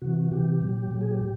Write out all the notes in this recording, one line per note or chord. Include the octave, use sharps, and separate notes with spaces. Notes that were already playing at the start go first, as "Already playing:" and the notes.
C3 E3 F#4
C3 E3 G4
A#2 F#3
A#2 F#3
G#4
G4
A2